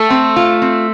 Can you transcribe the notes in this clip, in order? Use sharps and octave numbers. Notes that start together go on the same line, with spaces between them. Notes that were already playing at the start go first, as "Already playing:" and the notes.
Already playing: A3 A4
C4
F4
C4